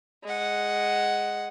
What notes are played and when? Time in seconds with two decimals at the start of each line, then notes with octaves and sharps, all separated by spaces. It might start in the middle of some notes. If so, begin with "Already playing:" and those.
0.24 G#3 F#5